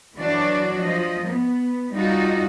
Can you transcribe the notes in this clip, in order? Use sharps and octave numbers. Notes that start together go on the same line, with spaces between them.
E3 F#3 D4 F#4 D5
F3 D#5
B3
G3 D#4 F4 F#4